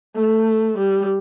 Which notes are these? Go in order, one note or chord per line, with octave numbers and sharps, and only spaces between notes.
A3
G3